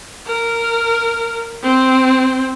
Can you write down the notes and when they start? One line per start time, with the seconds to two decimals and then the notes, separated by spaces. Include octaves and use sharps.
0.27 A#4
1.63 C4